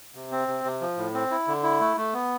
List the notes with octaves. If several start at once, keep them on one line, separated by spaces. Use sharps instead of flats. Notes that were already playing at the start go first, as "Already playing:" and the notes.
C3
C4
C3
C3
F3
A2
C4
E4
D3
E4
A3
A3
B3